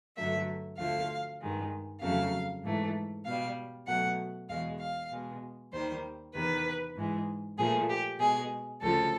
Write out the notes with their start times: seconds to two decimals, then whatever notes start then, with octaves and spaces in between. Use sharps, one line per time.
0.16 G2 D3 F#3 A3 E5
0.78 D2 D3 F3 A3 F5
1.40 G2 D#3 G#3
2.01 F2 C#3 F#3 A3 F5
2.64 G#2 E3 A3
3.25 B2 G3 F5
3.87 B2 F#3 A3 F#5
4.49 E2 B2 G#3 F5
4.80 F5
5.11 B2 G#3
5.72 D#2 D#3 G3 C5
6.34 E2 C3 D#3 B4
6.96 G#2 E3 G#3
7.58 A#2 F3 A3 G#4
7.89 G4
8.19 B2 G#3 G#4
8.81 D2 C#3 F3 A4